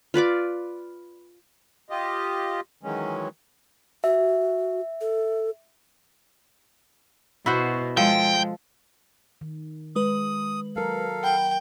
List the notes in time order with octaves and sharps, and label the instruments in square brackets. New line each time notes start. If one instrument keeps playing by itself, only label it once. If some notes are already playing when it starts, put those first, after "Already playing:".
[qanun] F4 B4 D5 D6
[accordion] F4 G4 D#5
D#3 E3 F#3 G#3 C#4
[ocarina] F#4 [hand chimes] E5
[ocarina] A4
[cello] B2 [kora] E4 F#4 C5
[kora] F3 A4 [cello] G#3 [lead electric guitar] G5
[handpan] D#3
[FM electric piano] G#3 B4 [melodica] D#6
[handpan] F#3 A#4 [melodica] A4 F5
[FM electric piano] F#5 B5 [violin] G5